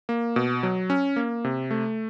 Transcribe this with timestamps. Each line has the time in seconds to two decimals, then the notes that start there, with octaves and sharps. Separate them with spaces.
0.09 A#3
0.36 B2
0.63 F#3
0.90 C#4
1.16 A#3
1.44 C3
1.71 A3